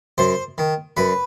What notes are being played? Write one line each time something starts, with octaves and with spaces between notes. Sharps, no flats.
F#2 C5
D#3
F#2 B4